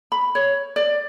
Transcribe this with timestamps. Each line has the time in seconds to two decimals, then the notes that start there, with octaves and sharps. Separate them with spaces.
0.12 B5
0.35 C#5
0.76 D5